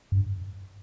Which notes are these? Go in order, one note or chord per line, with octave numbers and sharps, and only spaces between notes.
G2